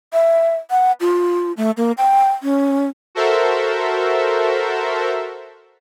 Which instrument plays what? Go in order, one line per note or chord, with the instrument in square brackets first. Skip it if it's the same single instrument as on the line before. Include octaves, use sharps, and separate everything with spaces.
[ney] E5
F#5
F4
A3
A#3
G5
C#4
[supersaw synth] F#4 A4 A#4 C5 E5